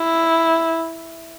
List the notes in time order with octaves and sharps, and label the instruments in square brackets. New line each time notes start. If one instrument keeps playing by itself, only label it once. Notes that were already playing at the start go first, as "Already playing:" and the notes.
Already playing: [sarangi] E4